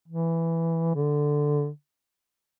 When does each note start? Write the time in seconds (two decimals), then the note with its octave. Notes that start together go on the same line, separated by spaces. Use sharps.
0.08 E3
0.95 D3